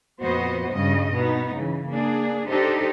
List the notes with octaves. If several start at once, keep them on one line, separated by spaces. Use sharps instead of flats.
F2 A#2 B3 F#4 C5 D#5
G2 C#3 G3 D#5
B2 B3 D#4
C#3 E3
A#3 D4 G#4
D4 D#4 G4 A4 C5 D#5